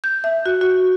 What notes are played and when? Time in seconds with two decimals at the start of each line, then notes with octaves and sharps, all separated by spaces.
0.04 G6
0.24 E5
0.46 F#4
0.61 F#4